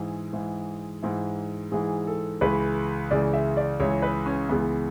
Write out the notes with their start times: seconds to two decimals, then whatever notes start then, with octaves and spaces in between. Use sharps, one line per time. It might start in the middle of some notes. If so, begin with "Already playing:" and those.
Already playing: G#2 E3 G#4
0.33 G#2 E3
1.03 G#2 E3
1.72 G#2 E3 G#4
2.07 A4
2.41 C#2 C#3 E3 B4
3.10 C#2 C#3 E3 D5
3.34 E5
3.57 D5
3.80 C#2 C#3 E3 C#5
4.02 B4
4.26 C#4
4.49 C#2 C#3 E3 B3